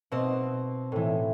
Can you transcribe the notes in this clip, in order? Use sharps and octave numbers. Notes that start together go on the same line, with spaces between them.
B2 C4
A2 E3